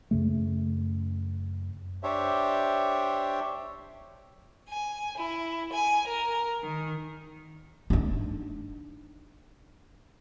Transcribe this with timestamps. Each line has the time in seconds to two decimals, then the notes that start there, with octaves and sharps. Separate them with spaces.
0.11 F#2 C#3 A3
2.03 D4 G4 C5 C#5 E5
4.69 G#5
5.17 E4
5.71 G#5
6.07 A#4
6.62 D#3
7.90 D4 D#4